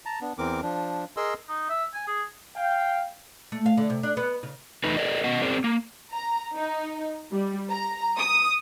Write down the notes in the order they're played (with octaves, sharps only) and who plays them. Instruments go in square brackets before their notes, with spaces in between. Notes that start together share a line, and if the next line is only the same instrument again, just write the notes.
[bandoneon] A5 A#5
B3 D4
E2 E3 C4 A#4 D6
F3 D4
G#4 A#4 D#5 C6 E6
[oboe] D#4
E5
G#5
G#4
[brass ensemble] F5 G5
[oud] A3
F5
D3
C3
D4
B3
C#3
[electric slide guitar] E2 A3 D#4 B4
G#4 A#4 D5 D#5
B3 C#4 D#5 F#5
C4 G#4 A#4 C5 D5
A#3
[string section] A#5
D#4
G3
A#5
D#6